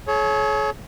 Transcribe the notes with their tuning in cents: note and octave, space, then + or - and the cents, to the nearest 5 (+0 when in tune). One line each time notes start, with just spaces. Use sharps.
G#4 +45 C#5 +0